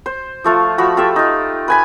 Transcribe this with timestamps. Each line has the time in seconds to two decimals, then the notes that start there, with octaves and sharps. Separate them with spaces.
0.06 C5
0.44 F3 A3 F4
0.78 F3 F#4 B5 C#6
0.97 F4 G4 A4 E5
1.16 D#4 F4
1.68 B4 G#5 B5